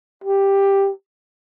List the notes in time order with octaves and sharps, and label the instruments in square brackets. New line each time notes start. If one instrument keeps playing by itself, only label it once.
[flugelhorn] G4